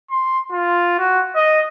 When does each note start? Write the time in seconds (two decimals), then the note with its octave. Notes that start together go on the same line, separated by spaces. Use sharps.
0.10 C6
0.52 F4
0.99 F#4
1.36 D#5